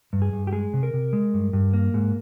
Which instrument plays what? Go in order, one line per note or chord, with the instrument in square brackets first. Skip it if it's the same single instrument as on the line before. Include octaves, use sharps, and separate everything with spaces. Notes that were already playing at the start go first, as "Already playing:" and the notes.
[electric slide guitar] G2
G#4
G2
G4
G#3 G#4
C3
A#4
C3
G#3
G2
G2
A#3
G#2